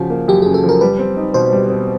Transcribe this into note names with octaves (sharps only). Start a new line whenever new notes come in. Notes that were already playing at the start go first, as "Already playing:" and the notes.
Already playing: C#3 F3 F#4
A#3
F#2 G4
C#3 G#4
A4
F3
A#4
G3 B4
C4
D#4
B2 C5
G3
C4